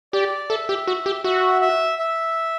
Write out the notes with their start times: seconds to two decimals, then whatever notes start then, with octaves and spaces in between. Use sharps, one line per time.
0.13 G4 D5
0.50 A4 E5
0.69 G4
0.87 F#4
1.06 G4
1.24 F#4 E5
1.61 E5
1.99 E5